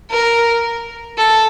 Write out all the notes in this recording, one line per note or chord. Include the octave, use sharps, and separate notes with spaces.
A#4
A4